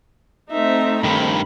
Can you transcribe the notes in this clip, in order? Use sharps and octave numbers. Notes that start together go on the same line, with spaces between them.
A3 C4 D#4 E5
G2 D#3 B5